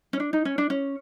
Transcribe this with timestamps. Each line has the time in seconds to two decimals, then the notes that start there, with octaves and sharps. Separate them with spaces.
0.13 C#4
0.20 D4
0.33 D#4
0.45 C#4
0.58 D4
0.70 C#4